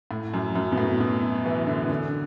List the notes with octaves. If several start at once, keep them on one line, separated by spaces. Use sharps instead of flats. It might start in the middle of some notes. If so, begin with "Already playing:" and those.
A2
F#2
F#2
B2
A2
B2
E3
D3
D3